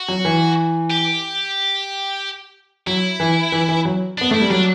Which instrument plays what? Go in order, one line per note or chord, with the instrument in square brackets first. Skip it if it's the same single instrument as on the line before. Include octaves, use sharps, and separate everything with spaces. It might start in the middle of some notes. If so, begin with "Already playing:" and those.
Already playing: [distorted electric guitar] F#4
[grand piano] F#3
E3
[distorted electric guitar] G4
[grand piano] F#3 [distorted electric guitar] E4
[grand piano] E3
E3
E3
F#3
[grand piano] B3 [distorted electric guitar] D4
[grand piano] A3 [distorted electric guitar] E4
[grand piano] G3
[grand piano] F#3 [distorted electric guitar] D4